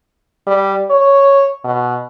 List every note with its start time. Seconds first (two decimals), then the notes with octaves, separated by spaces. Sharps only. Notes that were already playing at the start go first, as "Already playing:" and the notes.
0.47 G3
0.90 C#5
1.64 B2